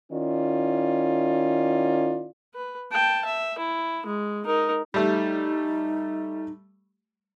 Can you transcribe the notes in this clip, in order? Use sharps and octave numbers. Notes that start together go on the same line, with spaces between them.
D#3 C#4 E4 F4 D5
B4
G5 A5
E5
E4
G#3
D#4 A#4
G3 A3 D#4